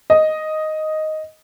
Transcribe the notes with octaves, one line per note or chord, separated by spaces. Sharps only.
D#5